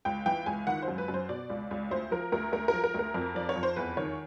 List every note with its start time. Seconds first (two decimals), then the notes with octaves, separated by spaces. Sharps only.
0.05 C#2 G5
0.26 E3 G5
0.46 C#2 G#5
0.67 D#3 F#5
0.82 C5
0.88 F#2
0.98 B4
1.08 F#2
1.14 C5
1.29 B2 D5
1.50 C#2
1.71 C#2
1.91 D2 C5
2.11 F3 A#4
2.32 D2 A#4
2.53 D2 A#4
2.68 A#4
2.73 F3
2.84 A#4
2.94 D2 A#4
3.14 F2
3.35 F3 D5
3.49 C#5
3.56 F2
3.63 C5
3.76 E2 B4
3.97 D#3 C#5